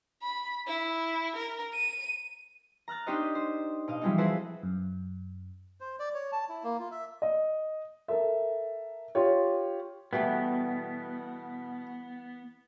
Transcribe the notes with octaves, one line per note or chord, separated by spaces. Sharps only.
B5
E4
A#4
D#7
A#5 F6 F#6 A6
D4 D#4 G4 C5 C#5 D#5
C5
B2 D#5 F5
E3 F3 G3 G#3 C4 D#4
E4 F#4 G#4 A4 B4 C5
F#2
C5
D5
C#5
A5
E4
A#3
F4
E5
D#5
A4 A#4 E5
F4 G4 C#5
B2 E3 G3 A3 B3